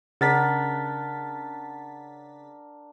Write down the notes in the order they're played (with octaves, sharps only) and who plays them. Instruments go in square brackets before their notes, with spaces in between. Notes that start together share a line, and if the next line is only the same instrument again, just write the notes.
[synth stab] C#3 A6 B6 [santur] D4 A#4 F#5